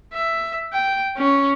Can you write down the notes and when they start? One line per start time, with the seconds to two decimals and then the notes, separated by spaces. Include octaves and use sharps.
0.14 E5
0.73 G5
1.17 C#4